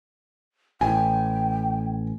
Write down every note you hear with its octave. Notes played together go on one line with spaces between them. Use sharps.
A1 G5 G#5